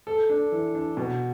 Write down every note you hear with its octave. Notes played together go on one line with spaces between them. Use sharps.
A4
D4
E3
D4
B2